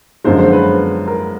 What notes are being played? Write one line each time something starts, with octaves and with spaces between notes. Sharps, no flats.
F#2 D3 F3 G#3 C5
C5
B4
A#4